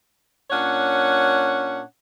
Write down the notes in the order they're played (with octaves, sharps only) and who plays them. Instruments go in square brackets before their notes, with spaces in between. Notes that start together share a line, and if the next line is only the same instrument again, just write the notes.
[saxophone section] A#2 C#4 D4 C#5 F#5